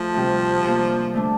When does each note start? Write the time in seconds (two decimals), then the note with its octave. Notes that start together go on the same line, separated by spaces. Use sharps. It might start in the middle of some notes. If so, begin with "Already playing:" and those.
Already playing: F3 A3
0.14 D2 C3 G3
0.64 C3 G3 A#3
1.14 D3 A3 D4